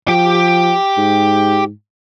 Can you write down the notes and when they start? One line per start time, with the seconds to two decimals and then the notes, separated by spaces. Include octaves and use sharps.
0.08 F3 G4 G5
0.97 G#2